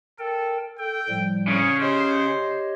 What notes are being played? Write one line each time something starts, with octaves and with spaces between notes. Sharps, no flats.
A4 A#4 G5
A4 G5
A2 F3 G3
C#3 C#5
G4 C5 C#5 D#5